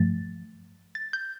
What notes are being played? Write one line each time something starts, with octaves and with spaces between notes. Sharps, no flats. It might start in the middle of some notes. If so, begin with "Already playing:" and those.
Already playing: G2 F3 A3 A6
A6
G6